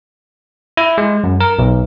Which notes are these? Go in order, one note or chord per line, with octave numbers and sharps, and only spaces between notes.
E4
G#3
F#2
A#4
B1